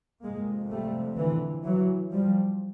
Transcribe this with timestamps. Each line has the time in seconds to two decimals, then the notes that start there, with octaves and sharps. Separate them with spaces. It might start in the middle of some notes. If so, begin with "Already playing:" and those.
0.23 F2 C3 G#3 A#3
0.71 G3 A3
1.18 D3 E3
1.65 E3 F#3
2.12 F3 G3